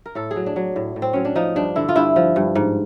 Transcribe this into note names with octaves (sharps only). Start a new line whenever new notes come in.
A#4
A2 A4
G#4
F#3
D4
F#3
A2
A2
C4
F#3 C#4
D4
F3 D#4
G2 D4
D3 E4
F4
G2 E4
F3
G2
G#2